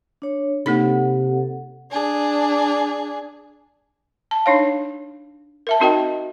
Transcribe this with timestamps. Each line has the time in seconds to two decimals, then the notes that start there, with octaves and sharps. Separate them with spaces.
0.22 D4 C#5
0.66 C3 A#3 D#4 A4 F#5 B5
1.91 D4 G#4
4.31 A5
4.46 D4 D#4 C#5 F5
5.67 A#4 E5 A5
5.80 C4 D#4 F#4 A#4 D#5 G5